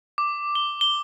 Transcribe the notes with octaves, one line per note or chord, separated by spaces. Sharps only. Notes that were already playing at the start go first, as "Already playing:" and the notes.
D6
G7
G7